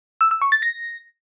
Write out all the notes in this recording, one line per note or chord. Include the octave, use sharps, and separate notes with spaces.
E6
E6
C#6
A6
A#6